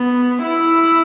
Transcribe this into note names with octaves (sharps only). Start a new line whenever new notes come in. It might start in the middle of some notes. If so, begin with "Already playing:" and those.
Already playing: B3
E4